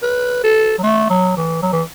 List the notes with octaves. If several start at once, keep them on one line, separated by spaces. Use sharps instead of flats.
B4
A4
F#3
A3
F#3
E3
F#3
E3